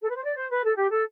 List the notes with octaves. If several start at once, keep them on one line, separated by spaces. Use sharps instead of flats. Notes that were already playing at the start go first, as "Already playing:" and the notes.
A4
B4
C5
D5
C5
B4
A4
G4
A4